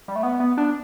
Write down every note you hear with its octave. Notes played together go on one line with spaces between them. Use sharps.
G3
A3
B3
B3
D4